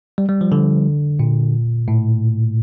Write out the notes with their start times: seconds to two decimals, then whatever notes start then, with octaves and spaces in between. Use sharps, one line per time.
0.18 G3
0.29 G3
0.41 F3
0.52 D3
1.19 A#2
1.88 A2